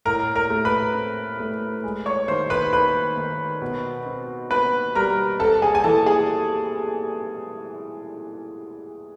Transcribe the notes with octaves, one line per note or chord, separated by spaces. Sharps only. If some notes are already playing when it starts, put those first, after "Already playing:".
A2 A#4 A#5
A#4 A#5
A3
B4 B5
C4
A3
G#3
C#5 C#6
D#3 C5 C6
B4 B5
D#3 B4 B5
D#3
B2
C4
C4 B4 B5
G3 A#4 A#5
C4 A4 A5
G#4 G#5
G#5
E3 A4 A5
G#4 G#5